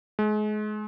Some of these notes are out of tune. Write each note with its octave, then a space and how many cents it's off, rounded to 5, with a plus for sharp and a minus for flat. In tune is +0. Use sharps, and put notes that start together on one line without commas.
G#3 +35